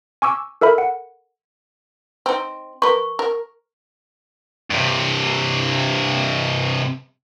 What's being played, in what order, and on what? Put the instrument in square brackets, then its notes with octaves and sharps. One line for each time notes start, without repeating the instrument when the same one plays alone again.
[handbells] G#5 C#6 D6 E6
A4 A#4 E5 B5
F#5
[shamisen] C4 D#4
[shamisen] A#4 B4 [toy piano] C#6
[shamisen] A#4
[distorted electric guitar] G2 C3